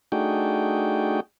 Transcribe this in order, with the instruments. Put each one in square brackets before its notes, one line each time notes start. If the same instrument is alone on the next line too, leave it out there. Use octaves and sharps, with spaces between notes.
[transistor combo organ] A3 D4 D#4 F#4 G#4 G5